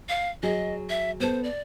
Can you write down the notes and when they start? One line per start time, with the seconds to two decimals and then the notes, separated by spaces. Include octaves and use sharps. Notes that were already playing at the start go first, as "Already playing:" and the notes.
0.09 F5
0.43 F#3 G#4 D#5
0.89 E5
1.20 B3 A4 C5
1.44 D5